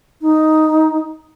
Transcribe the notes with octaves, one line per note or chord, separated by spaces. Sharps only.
D#4